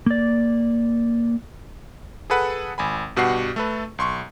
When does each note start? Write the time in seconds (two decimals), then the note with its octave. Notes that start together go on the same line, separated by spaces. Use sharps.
0.06 A#3 D5
2.30 G#4 A4 B4 F#5
2.78 G#1 G#5 B5
3.16 G2 B2 F#4 G4 F#5 C7
3.56 A3 A4 B4
3.98 B1 C6 C#6